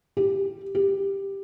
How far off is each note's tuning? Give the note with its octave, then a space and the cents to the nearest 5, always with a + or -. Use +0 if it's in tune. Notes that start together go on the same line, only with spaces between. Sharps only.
G4 +0
G4 +5